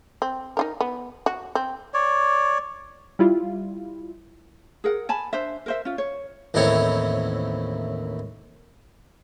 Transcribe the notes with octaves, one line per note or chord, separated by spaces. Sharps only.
C4
D#4 F4 A#4
B3
F#4
C4
C#5 D5
G3 E4 F4
G#4 A#4 F#5
G#5 A5 B5
D4 C5 E5
A#4 C5 E5
C#4 F4
C#5
A1 D#2 C4 E4 C#5